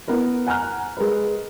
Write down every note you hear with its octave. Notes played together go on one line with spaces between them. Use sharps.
B3 E4 A#4 B4
F#5 G#5 A#5 F6 F#6
G#3 A#4 B4